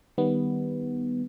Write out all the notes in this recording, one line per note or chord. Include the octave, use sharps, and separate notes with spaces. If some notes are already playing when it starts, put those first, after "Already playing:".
D#3 G3 B3